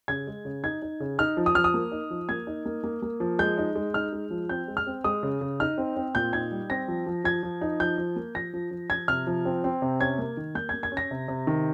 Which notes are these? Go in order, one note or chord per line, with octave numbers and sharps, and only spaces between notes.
C#3 G#6
G#3
C#3
D#4 G#6
D#4
C#3
D#4 F6
F3
D#6
F3 F6
D#6
A#3
D#4
F3
A#3 G#6
D#4
A#3
A#3
A#3
F3
G#3 G6
D#4
G#3
D#4 F6
G#3
F3
C4 G6
G#3
F6
C4
G#3 D#6
C#3
C#3
D#4 F6
C4
C4
A#2 G6
D#4 G#6
G3
C4 A#6
F3
F3
F3 G#6
F3
D#4
F3 G6
F3
A#3
F3 A#6
F3
F3
F3 G#6
C3 F6
F3
C4
C4
C3
C#4 G#6
A#3
D#3
A#3 G6
A#3 G#6
G#6
C#4
A#6
C3
C3
D#3